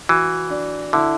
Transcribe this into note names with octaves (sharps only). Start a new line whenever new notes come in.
E3 F#4
D4
D3 E4